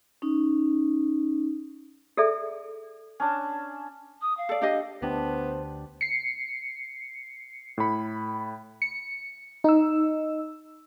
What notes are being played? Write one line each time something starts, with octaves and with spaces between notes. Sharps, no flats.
C#4 D#4
G#4 A4 D5 E5
C#4 D4 A5
D#6
F5
A4 D5
D4 G4 D#5
D2 B3 D4 G4 C5
C7 C#7
A2 B5
C#7
D#4 E6